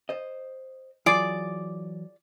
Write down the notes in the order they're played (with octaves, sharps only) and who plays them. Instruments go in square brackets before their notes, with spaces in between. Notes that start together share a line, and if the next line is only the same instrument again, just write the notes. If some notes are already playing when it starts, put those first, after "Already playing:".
[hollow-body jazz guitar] C5 D#5
[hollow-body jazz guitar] E3 F#3 [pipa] F4 G#4 D5 [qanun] D6